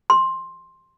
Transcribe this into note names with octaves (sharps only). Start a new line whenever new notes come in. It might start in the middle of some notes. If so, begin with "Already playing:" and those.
C6